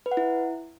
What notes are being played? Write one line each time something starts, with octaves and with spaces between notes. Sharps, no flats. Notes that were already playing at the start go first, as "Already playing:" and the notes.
B4
F#5
E4